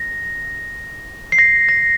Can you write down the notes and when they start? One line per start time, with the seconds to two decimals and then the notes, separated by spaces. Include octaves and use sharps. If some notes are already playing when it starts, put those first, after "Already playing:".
Already playing: A#6
1.32 C7
1.39 A#6
1.69 A#6